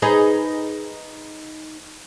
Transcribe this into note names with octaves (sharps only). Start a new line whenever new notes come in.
D#4 G#4 B4